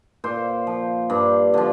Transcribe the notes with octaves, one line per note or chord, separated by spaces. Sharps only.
A#2 C5
F3
G2
D3 F3